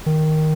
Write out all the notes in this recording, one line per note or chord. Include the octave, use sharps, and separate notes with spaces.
D#3